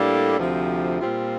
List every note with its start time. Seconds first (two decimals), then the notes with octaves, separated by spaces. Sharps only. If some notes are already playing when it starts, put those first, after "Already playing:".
Already playing: A2 G3 A#3 D4 A4
0.37 D2 C3 F3 C4
1.00 A#2 G3 C4 F4